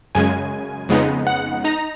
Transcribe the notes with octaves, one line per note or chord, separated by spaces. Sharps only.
F#2 C#3 G#3 G#5
F2 C#3 G#3 B3 D#4
F#5
D#4 A#5